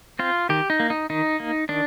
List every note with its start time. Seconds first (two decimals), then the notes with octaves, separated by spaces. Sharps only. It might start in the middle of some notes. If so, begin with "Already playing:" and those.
0.19 C4 F4
0.49 D#3 G4
0.70 D#4
0.80 A#3
0.90 D#4
1.10 D#3 D#4
1.40 A#3
1.69 D#3 D4